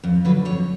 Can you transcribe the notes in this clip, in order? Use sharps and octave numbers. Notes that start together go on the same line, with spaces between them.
F2
D3 F#3 B4
F2 C#5